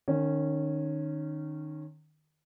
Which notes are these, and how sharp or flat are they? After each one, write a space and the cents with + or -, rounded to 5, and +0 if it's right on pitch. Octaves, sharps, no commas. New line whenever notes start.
D#3 -30 C#4 -10